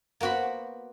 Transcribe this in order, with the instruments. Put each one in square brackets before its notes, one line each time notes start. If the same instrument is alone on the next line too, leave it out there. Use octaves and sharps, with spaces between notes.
[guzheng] A#3 B3 F#4 C5 B5